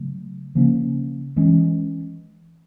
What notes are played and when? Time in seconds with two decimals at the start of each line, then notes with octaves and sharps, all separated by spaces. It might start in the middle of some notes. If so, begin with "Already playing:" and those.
Already playing: C#3 F#3 A3
0.55 C#3 F3 A#3 C#4
1.36 E3 G#3 C#4